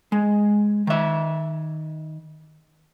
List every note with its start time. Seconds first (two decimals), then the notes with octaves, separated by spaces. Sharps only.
0.12 G#3
0.87 D#3 E5